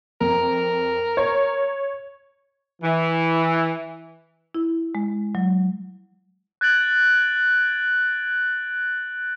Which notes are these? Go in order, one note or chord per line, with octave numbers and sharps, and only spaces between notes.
F2 A#4
C#5
E3
E4
G#3
F#3
F#6 G#6 A6 D7 F#7